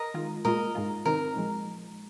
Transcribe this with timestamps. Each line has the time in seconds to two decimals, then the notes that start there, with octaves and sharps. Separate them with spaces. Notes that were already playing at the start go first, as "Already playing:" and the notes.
Already playing: A#4 D#5
0.14 D#3 G#3 F4
0.45 A#2 G#3 F4 A#4 D#5
0.75 G#2 G#3 F4
1.05 C3 D#3 C4 D#4 A#4
1.35 A#2 F3 G#3